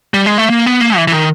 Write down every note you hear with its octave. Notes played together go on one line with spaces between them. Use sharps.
G3
G#3
A3
A#3
B3
A#3
E3
E3
D#3